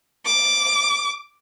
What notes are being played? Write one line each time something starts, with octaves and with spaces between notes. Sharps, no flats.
D6